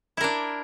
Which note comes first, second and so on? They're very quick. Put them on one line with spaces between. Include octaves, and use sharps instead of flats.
E4 A#4 D4